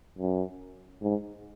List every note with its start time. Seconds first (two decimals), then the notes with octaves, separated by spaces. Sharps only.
0.18 F#2
1.03 G#2